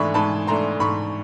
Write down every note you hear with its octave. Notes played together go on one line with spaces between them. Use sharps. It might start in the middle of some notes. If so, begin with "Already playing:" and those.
Already playing: G#2 E3 A3 D4 B5 C#6
G#2 A5 B5
E3 A3 D4 A#5 C6
G#2 B5 C#6